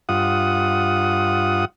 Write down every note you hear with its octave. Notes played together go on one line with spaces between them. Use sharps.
G2 F4 F#5 D#6